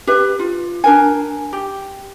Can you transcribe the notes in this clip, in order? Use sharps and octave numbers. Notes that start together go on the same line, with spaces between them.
G4 B4 E5
F4
D4 A#4 G#5
G4